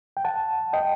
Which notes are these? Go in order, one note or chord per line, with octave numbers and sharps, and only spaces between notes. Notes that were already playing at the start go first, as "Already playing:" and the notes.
G5
F#5 A5
D#5 G5